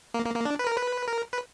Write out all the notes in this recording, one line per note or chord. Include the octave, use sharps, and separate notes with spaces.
A#3
A#3
A#3
D4
B4
A#4
B4
A#4
B4